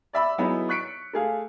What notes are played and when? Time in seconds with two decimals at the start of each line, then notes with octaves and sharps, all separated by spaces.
0.13 D5 E5 B5 E6
0.38 F#3 B3 D#4 E4 G#4 B5
0.69 C#6 F#6 B6 C#7 D7
1.13 A3 G#4 F5